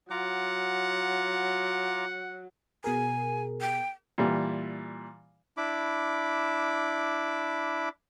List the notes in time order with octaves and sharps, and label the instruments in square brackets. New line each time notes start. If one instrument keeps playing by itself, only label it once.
[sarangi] F#3 [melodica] F4 A#5 D6 [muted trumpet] F#5
[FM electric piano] B2 G#4 A#4 [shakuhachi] G#5
[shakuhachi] G5
[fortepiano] A#2 E3 G3
[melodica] D4 E4 B5 D6